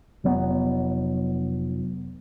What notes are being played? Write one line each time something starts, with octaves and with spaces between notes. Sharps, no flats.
F1 F#3 B3